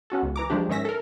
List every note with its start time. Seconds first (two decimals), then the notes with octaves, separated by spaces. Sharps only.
0.10 B3 C#4 F#4 A4
0.22 C#2
0.36 E3 A#5 D6
0.50 F3 G#3 A3 D4 G4
0.69 G#2 D#3 C#4 E5 A#6 B6
0.85 A4 A#4